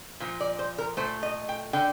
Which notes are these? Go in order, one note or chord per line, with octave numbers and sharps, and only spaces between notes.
A#2 F3
D5
C5
A#4
A#2 A3 C5
D#5
G5
D3 G5